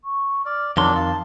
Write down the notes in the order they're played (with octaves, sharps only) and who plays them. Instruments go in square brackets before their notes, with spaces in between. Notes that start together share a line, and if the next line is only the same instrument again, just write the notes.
[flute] C#6
[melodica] D5 [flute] F6
[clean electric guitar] F2 D#3 C6 [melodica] F#3 D4 [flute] C#5
[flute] F5 [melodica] A5